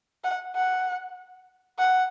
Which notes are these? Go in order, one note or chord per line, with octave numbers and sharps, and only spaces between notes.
F#5
F#5
F#5